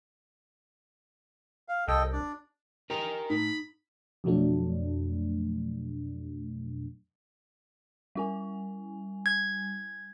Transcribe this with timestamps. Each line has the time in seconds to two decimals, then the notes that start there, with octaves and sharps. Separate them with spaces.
1.68 F5
1.88 C2 A4 D#5 G5
2.13 D4 D5
2.90 G4 A#4 D#5 G5 G#5 A#5
3.30 A2 D#4 B5
4.24 F2 B2 F#3 A3 D4
8.15 G3 E4 G#5
9.26 G#6